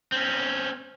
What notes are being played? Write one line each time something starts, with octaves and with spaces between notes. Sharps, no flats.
C4 C#4